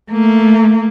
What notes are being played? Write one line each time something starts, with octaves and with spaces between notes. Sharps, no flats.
A3 A#3